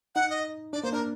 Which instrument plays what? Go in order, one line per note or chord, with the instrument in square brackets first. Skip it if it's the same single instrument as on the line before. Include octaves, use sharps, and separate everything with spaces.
[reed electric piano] D#4 [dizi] F#5
[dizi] D#5
[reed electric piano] D4 [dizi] D5
[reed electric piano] A#3 [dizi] C5
[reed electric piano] D4 [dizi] A#4